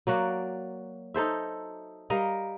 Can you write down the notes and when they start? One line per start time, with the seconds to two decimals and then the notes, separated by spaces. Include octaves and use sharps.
0.07 F#3 A#3 F#4 D5
1.14 D#4 A4 C5 E5
2.10 G3 A#4 D#5 F5